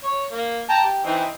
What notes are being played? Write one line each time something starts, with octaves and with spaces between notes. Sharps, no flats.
C#5
A#3
G5 A5 A#5
G4
E3 C4 D#4